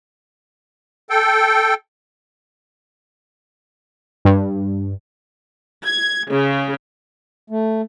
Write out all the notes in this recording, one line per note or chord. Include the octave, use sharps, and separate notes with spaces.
A4 G5
G2
G#6
C#3
A3